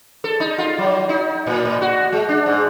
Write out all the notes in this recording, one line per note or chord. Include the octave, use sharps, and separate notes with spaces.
A4
D#4
F4
F#3
D#4
A2
A2
F#4
G#3
D4
G#2